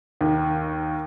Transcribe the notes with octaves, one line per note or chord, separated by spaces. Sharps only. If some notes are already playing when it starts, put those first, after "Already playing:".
D#2 D#3